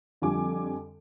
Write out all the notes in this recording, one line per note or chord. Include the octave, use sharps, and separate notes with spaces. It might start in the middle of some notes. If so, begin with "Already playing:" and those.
F2 D3 F3 G3 G#5 D6